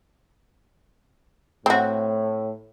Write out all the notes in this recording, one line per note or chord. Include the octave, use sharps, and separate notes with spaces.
A2 C4 F#4